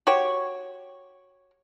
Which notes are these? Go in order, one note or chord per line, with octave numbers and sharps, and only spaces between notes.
F#4 G4 C#5